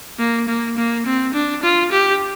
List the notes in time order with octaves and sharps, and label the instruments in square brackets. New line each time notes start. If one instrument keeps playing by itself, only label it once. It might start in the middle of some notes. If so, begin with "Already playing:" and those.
[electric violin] A#3
A#3
A#3
C4
D4
F4
G4